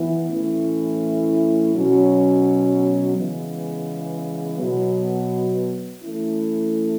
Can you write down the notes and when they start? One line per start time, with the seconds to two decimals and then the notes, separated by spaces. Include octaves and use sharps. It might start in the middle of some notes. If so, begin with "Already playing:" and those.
Already playing: E3 B3 E4
0.29 A2 E3 A3 C#4 E4
1.71 B2 F#3 C#4
3.15 C#3 E3 G#3 B3
4.58 B2 F#3 B3
6.02 E3 A3 C#4 E4